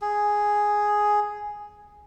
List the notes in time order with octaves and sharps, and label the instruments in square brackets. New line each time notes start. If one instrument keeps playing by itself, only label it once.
[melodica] G#4